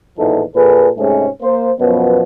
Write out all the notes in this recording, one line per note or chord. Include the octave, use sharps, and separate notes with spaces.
A1 E2 A#2 F3 D#4 A4
A#2 G#4 A4 B4
G#2 C3 G#3 A3 C#4 G#4
A#3 C5
F#2 B2 F3 F#3 B3